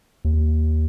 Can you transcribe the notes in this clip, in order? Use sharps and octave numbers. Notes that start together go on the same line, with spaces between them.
D#2